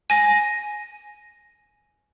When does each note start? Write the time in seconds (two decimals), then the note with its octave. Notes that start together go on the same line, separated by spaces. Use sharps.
0.10 G#5 A#6